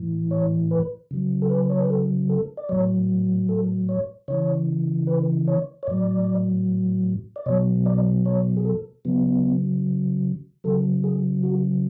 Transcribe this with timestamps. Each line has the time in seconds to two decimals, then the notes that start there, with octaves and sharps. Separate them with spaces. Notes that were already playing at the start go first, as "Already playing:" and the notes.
Already playing: A2 E3
0.31 C#5
0.71 B4
1.11 C#3 F#3
1.42 A4
1.50 B4
1.69 C#5
1.80 B4
1.90 A4
2.29 A4
2.57 D5
2.69 A2 F#3 C#5
3.49 A4
3.89 C#5
4.28 C#3 E3 C#5
5.07 B4
5.47 C#5
5.83 C#5
5.87 A2 F#3 D5
7.36 D5
7.46 B2 F#3 C#5
7.86 D5
8.25 C#5
8.57 G#4
8.65 A4
9.05 C#3 F#3 B3
10.64 C#3 F#3 A4
11.04 G#4
11.43 F#4